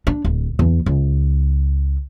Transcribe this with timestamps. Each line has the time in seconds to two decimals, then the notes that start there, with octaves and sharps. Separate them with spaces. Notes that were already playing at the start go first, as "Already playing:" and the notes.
0.07 D4
0.24 D1
0.59 E2
0.86 C#2